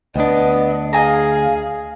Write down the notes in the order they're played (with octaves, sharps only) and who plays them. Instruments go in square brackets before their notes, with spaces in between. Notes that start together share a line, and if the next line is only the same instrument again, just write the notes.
[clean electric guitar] D2 D4 [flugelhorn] B3 [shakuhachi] D#5
[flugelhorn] G#4 [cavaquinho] D#5 G#5 A#5 [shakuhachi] F5